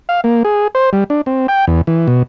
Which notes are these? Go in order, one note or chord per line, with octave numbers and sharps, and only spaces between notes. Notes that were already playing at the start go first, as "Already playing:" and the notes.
F5
A#3
G#4
C5
G3
D4
C4
G5
E2
E3
B2